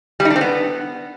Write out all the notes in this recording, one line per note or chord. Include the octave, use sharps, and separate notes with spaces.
G3
D#4
D4
C4
B3